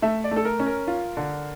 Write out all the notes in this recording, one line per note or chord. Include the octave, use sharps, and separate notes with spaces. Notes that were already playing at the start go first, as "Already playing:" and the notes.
A3 E5
D5
A3
A4
A#4
C#4
A#4
F4
D3